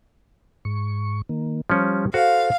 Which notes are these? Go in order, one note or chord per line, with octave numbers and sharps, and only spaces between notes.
G#2 C#6
D#3 A#3
F3 G3 C#4
F#4 A4 C5 F5